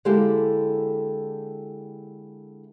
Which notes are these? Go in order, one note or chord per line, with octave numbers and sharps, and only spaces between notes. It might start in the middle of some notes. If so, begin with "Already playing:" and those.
D3 G#3 A#3 E4 G4 A4